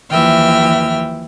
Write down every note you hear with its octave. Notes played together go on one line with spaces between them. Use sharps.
D#2 E3 F3 E5 G5 F6